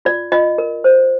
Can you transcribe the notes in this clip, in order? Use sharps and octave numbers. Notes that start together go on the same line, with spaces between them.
F4 D5
F4 D#5
A#4
C5